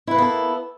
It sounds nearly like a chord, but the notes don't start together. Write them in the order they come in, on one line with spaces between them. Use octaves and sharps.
E4 B4 A#3 B3 A4